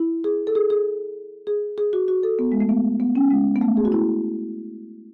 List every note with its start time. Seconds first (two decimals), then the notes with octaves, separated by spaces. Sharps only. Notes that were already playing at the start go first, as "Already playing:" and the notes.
Already playing: E4
0.24 G#4
0.47 A4
0.55 G#4
0.70 G#4
1.47 G#4
1.78 G#4
1.93 F#4
2.08 F#4
2.23 A4
2.39 B3
2.52 G#3
2.60 A3
2.69 B3
3.00 B3
3.15 C#4
3.31 G#3
3.55 B3
3.61 A3
3.77 G#4
3.85 F#4
3.92 E4